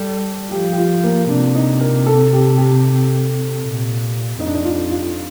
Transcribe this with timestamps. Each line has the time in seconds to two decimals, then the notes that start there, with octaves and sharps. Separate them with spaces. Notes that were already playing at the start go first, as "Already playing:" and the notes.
Already playing: G3 A4
0.51 F3 G4
0.72 G4
0.78 F4
1.03 A#3
1.29 C3 D4
1.55 D#4
1.80 A#4
2.06 A4
2.32 G4
2.58 G4
3.62 A#2
4.39 F2 D#4
4.46 D4
4.54 D#4
4.64 F4
4.90 F4